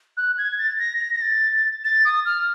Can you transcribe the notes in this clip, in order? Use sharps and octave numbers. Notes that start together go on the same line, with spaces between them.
F#6
G#6
A6
A#6
A#6
A#6
A6
A6
D#6
F6